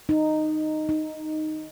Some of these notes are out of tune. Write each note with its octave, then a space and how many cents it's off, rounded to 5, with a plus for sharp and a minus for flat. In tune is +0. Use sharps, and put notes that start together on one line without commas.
D#4 -10
D#4 +0